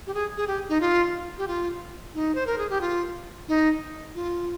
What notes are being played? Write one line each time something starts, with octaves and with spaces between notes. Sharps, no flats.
G4
G#4
G#4
G4
D#4
F4
G4
F4
D#4
C5
A#4
G#4
G4
F4
D#4
F4